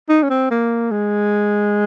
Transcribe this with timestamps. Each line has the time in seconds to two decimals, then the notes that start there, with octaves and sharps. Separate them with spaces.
0.09 D#4
0.23 C#4
0.30 C4
0.51 A#3
0.91 G#3